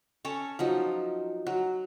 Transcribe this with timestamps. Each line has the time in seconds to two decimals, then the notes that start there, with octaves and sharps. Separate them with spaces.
0.25 C#4 A4 C#5
0.59 F3 F#3 D#4
1.47 F#3